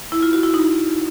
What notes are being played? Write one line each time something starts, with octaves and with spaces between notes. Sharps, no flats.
E4
F4
F#4
E4
D#4